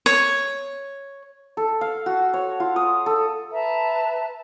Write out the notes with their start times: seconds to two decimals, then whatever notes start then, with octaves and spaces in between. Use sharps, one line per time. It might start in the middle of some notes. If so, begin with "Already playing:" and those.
0.06 C#5
1.57 A4
1.81 F5
2.06 F#4
2.33 C#5
2.60 F4
2.76 D#6
3.06 A4
3.53 B4 E5 A5 A#5